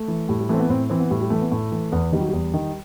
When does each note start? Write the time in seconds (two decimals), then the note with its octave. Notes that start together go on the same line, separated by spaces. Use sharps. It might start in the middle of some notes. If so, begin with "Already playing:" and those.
Already playing: A3
0.08 E3
0.29 A2 G3
0.40 G3
0.49 E3 A3 C4
0.59 B3
0.69 A2 C4
0.90 E3 C4
1.00 B3
1.10 A2 G3
1.21 G3
1.30 E3 A3
1.41 B3
1.51 A2 A3
1.72 E3
1.92 E2 B3
2.12 D#3 G3
2.20 F#3
2.29 E2 G3
2.54 D#3